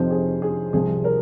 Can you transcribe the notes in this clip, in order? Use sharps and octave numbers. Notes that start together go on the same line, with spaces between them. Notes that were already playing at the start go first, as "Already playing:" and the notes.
Already playing: F2 C3 F3 C4 D#4 C5
G#4
G#4
C2 C3 F3 G#4
A#4